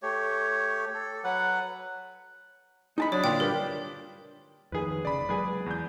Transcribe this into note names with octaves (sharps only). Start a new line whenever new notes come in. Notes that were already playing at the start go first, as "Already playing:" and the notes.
A3 G4 C#5
A4
F#3 B4 F#5
G#3 D#4 A5 B5
F#3 D4 C#5 D#6
A#2 D3 F4 B4 F5 G5
G2 G4 A#4
F2 D#3 G#4 B4
F1 C#3 D5 B5
F#3 G#3 G#4 B4
E2 G6